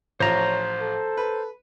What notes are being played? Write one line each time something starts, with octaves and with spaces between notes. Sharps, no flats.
A1 F3 C5 C#5 A#5
A4
B4